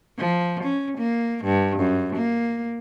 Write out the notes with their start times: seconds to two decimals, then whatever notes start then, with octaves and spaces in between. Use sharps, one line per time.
0.18 F3
0.64 C#4
0.98 A#3
1.44 G2
1.78 F#2
2.16 A#3